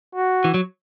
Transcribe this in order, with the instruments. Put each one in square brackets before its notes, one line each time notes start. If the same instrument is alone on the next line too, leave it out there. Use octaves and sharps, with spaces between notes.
[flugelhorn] F#4
[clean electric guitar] E3
F#3